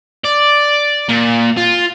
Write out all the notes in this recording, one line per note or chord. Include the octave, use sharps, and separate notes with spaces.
D5
A#2
F4